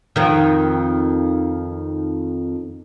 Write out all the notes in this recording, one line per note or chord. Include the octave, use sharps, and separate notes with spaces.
F2 D#3